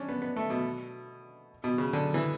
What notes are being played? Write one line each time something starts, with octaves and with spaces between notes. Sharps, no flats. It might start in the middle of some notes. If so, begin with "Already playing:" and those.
Already playing: C#4 D4
B3
B3
A3
B2
B2
C#3
D3
E3